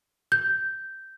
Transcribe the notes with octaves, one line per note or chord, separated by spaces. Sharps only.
G6